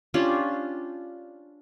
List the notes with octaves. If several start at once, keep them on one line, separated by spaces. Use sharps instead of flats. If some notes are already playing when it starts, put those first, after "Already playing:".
C#4 D4 F4 G4